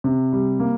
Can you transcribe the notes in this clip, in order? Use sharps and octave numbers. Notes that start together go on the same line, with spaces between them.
C3
G3
A#3